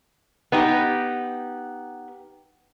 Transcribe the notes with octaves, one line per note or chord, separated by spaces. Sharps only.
B3 D#4 G4